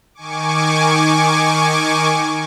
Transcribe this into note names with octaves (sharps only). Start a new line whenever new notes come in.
D#3 G#5 C#6 D6